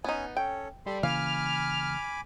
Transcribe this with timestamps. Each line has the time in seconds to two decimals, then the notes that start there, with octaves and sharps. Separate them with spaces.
0.04 B3 C#4 D#4 G#5
0.37 C#4 A4 C#5 G5
0.86 G3 A4 B5 C6
1.03 C#3 E3 A#3 F5 G#5 B5 D6 F6